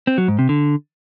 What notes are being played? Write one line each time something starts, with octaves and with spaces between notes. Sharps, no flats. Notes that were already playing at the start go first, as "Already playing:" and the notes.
C4
F#3
G#2
C3
D3